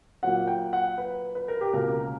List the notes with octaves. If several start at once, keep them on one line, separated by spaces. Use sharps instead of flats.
A#2 F#3 A#3 F#5
G5
F#5
B4
B4
A#4
G4
C#2 B2 A#3 A#4